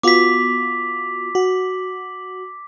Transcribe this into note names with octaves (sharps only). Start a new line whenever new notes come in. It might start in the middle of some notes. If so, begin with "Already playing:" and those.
B3 F4 F#4 D6 B6
F#4